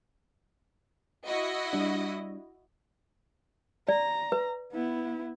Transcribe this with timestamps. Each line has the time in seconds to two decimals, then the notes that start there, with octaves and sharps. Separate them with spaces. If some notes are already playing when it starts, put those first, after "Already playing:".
1.26 E4 F#4 D#5
1.73 G3 D4
3.89 D5 A#5
4.32 B4
4.72 B3 E4